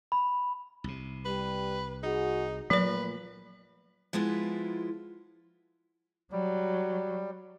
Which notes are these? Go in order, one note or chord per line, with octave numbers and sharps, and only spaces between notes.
B5
C2 C3
G3 B4
D#4 F#4 G#4
A#2 F3 F#3 A3 A#3 B4 D5
F3 G#3 B3 E4 F4
F#3 G3